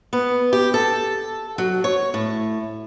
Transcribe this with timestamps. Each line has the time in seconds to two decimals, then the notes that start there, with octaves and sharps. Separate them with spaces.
0.13 B3
0.53 G4
0.74 A4
1.58 F#3
1.84 C#5
2.14 A2